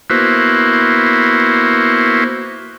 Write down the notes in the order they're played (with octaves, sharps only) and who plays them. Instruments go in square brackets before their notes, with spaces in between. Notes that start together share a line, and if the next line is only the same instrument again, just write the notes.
[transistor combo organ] A#3 B3 E4 F#4 C5